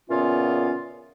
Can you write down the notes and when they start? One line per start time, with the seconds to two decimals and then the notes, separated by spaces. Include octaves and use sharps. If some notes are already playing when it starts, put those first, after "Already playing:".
0.09 A#2 C#3 E3 B3 C#4 F4